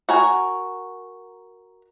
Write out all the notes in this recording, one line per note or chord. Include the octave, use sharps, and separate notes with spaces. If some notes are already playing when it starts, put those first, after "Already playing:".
F#4 A#4 G#5